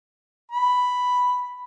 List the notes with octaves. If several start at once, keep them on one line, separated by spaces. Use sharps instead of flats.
B5